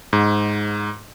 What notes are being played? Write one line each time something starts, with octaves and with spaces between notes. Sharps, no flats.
G#2